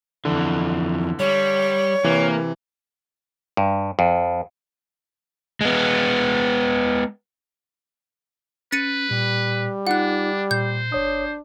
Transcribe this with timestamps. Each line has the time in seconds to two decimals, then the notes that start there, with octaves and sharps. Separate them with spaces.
0.25 F2 D3 E3
1.20 G3 C#5
2.04 C3 E3 A#3
3.57 G2
3.99 F2
5.61 G#3 B3
8.72 C#4 B4 A6 C#7 D#7
9.11 A#2 G3
9.87 D4 D#4 F4 F#5 F#6
10.51 A#2 C5 G6
10.92 G1 D4 C#5 D#6